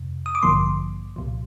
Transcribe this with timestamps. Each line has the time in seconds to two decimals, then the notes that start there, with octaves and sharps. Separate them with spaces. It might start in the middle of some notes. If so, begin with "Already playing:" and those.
Already playing: F2 C3
0.26 D#6
0.35 D6
0.43 A1 G2 D3 F3 A#3 C6
1.16 C2 A#2 F3